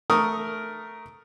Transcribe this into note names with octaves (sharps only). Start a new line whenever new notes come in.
A3 A#4 C#6 D#6